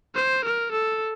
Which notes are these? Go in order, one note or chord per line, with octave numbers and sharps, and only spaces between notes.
C5
A#4
A4